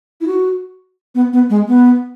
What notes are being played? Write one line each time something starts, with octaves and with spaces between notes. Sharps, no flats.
E4
F#4
B3
B3
G#3
B3